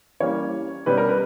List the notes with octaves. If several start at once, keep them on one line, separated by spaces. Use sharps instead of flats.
E3 G3 A#3 C#4 C#5
B2 G3 C#4 B4
A#4
B4